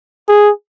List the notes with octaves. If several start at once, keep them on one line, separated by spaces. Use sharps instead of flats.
G#4